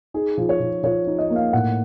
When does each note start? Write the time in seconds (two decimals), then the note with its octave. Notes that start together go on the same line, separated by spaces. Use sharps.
0.14 D#4 G#4
0.38 F3
0.49 C#5
0.60 F3
0.84 F3 C#5
1.07 D#4
1.18 D#5
1.30 A#3
1.36 F5
1.53 A2 F#5